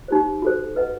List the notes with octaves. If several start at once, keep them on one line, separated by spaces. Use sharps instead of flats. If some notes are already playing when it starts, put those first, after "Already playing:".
D#4 G4 C5
F#4 A4 C5
B4 D#5 F#5